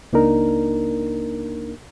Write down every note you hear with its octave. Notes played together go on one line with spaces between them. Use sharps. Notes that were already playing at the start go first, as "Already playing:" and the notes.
C#2 A#3 D4 D#4 A#4